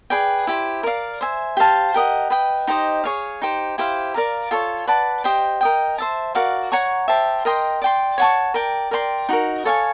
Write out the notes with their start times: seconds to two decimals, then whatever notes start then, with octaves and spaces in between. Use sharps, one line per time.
0.10 G#4 B4 D5 G5
0.47 E4 G4 C5
0.83 A#4 D5 F5
1.21 C5 E5 G#5
1.57 G4 C5 F5 A5
1.94 G4 A#4 D#5 F#5
2.30 B4 D#5 G5
2.67 D#4 G4 C5 D#5
3.04 G#4 C#5 F5
3.42 D#4 G4 C5
3.78 E4 G4 C5 F5
4.14 A#4 D5 F5 A#5
4.51 F4 A4 C#5
4.87 B4 D5 F#5 A5
5.24 G4 C5 D#5 G5
5.61 A#4 D#5 G5
5.98 C5 E5 A5
6.35 F#4 A#4 D5 F5
6.72 C#5 F#5 A#5 C#6
7.08 G4 C5 E5 A5
7.45 A#4 D#5 G5 C6
7.82 D5 G5 C6
8.18 C#5 F#5 A5 C#6
8.54 A#4 D5 G5
8.91 A#4 D5 G5 C6
9.29 D#4 F#4 A#4
9.65 A4 C#5 F5 G#5